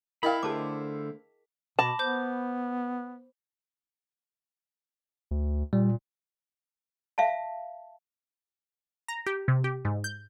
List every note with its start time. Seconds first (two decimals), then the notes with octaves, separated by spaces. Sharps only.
0.23 E4 A#4 D#5 F5 G5 B5
0.43 D3 A3 G#4 C5 A5 D6
1.79 B2 A5 B5 D6 A#6
1.99 B3 C5 D6 G6
5.31 D2
5.73 A#2 G3
7.18 E5 F5 A5
9.08 A#5
9.26 G4
9.48 C3
9.64 G4
9.85 G#2
10.04 G6